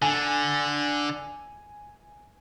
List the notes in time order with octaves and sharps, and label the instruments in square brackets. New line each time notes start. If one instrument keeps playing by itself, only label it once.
[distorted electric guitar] D3 [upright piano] G#5